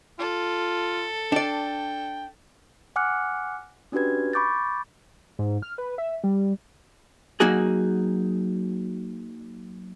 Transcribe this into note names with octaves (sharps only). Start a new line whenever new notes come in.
F4 A4
D4 D5 G5
F#5 G#5 D6 F6 F#6 C#7
C#4 D4 F#4 G4 B4 G#6
B5 C#6 D6 G6 A6
G#2
F6
B4
E5
G3
F#3 A#3 D#4 F#4 G#4